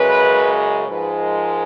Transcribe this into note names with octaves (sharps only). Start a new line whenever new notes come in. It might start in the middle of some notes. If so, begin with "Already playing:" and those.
Already playing: F#2 C#3 G#3 B4
G#2 F3 G#3 B4
A#4